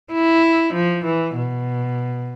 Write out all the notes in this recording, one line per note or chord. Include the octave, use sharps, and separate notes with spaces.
E4
F3
E3
B2